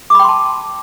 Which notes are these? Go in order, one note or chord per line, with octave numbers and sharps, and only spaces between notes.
G5 A5 B5 C6 D6